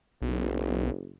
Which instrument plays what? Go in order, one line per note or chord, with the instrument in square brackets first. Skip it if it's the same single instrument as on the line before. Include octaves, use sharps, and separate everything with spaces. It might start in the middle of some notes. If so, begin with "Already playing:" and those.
[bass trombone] F#1 [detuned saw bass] B1